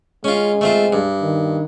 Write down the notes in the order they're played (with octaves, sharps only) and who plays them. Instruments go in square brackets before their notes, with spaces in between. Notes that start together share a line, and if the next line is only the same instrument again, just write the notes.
[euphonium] G#3 [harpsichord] C#4 F4
[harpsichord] A3 C4 F4
G2
[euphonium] D#3